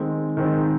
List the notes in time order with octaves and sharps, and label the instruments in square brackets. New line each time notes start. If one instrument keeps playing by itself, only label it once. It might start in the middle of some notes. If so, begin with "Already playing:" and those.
Already playing: [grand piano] D#3 G#3 C4
D#3 G#3 C4